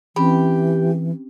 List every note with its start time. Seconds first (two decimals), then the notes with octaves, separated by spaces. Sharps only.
0.16 E3 C4 C#4 G4 B5